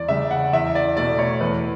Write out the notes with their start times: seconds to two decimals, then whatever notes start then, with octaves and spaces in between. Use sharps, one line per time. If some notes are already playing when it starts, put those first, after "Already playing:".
Already playing: E2 D5
0.08 C#3 G3 E5
0.31 F#5
0.53 E2 E5
0.75 D5
0.97 B2 A3 D5
1.19 C#5
1.40 E2 B4